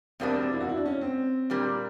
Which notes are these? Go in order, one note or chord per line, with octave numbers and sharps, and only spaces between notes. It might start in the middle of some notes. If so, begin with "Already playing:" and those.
E2 B2 G3 A#3 C4 D4
C4
E4
F#4
E4
D4
C#4
C4
A#2 G3 A#3 D4 G4